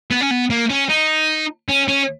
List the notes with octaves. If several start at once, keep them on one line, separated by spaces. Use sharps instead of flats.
B3
C#4
B3
A#3
C#4
D#4
C#4
C#4